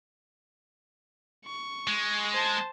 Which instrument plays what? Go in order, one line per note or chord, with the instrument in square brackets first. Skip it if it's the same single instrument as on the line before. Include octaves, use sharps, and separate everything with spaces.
[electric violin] C#6
[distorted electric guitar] G#3
[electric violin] C5 A5